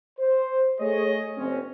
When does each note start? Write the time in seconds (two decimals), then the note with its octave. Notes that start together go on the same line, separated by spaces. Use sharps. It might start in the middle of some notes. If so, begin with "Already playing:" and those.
0.20 C5
0.80 A3 G#4 C#5 D#5
1.38 F#1 C4 C#4